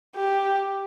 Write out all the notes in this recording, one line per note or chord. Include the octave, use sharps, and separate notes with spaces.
G4